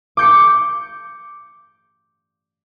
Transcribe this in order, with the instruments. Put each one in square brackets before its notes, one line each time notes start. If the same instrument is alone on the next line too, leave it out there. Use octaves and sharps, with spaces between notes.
[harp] D6 G6 C#7